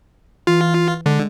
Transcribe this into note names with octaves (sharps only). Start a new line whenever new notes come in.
E3 F4
D3 G#3